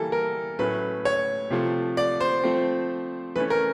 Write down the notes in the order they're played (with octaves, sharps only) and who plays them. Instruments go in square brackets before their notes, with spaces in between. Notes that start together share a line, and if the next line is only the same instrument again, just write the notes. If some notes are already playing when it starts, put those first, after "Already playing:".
Already playing: [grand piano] E3 G3 A#3 A4
A#4
A2 F#3 A3 C#4 B4
C#5
C3 F3 A3
D5
C5
F3 A3 C4
E3 A3 C#4 B4
A#4